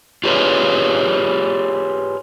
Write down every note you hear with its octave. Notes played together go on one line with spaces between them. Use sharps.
F4 G4 G#4 B4 C#5